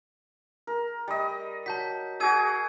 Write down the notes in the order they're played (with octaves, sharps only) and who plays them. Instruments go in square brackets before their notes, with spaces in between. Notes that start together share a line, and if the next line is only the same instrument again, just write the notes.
[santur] A#4
G3 D#5
[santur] F#3 [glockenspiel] A5 G6 B6
[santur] F#4 G#4 [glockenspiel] E6 G#6 D#7